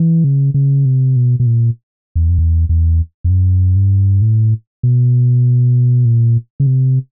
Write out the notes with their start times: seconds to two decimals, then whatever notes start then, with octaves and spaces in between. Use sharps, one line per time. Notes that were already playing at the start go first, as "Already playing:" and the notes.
Already playing: E3
0.24 C#3
0.54 C#3
0.85 C3
1.16 B2
1.40 B2
1.46 A#2
2.16 E2
2.29 F2
2.38 E2
2.69 E2
3.24 F2
3.30 F#2
3.76 G2
4.22 A2
4.83 B2
6.05 A#2
6.60 C#3
6.67 C3